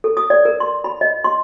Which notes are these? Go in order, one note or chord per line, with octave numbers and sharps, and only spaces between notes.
A4
D#6
D5
A#4
C6
B5
D#5
C6